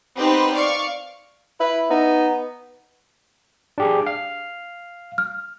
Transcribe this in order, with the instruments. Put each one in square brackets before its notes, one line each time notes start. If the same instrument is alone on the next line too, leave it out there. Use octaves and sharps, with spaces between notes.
[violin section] B3 C4 D#4 G4 B4 C5
D5 F5 C#6
[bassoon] E4 [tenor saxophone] B4
[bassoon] B3 [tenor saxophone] D#4
[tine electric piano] D4 G4 G#4
F5
[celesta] F6